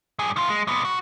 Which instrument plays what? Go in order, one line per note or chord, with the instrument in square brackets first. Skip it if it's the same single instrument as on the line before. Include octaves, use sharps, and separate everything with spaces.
[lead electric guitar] G2 G#4
D#3 F4
G#3
A#2 B3
F#4